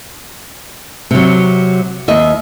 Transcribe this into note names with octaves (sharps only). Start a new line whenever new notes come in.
C3 F#3
D#2 D#5 E5